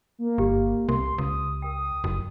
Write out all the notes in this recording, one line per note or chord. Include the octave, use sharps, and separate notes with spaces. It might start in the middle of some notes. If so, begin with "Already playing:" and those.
A#3
G1 G4
C2 C6
C#2 D#6
A#4 G5 D#6
F#1 F#4